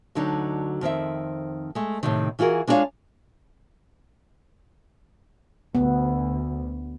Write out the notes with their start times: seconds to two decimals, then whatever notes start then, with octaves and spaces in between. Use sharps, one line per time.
0.15 D2 D3 F#3 D#4
0.81 F2 D#3 C4 E5
1.75 G#3 A3
2.03 A2 C3 D#3
2.39 E3 F4 F#4 G#4 A#4
2.67 G#3 D4 F4 G4 C#5 F5
5.75 D2 B3